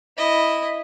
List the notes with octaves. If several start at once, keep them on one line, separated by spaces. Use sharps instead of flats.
E4 D#5